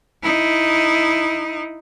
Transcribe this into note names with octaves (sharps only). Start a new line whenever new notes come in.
D#4 E4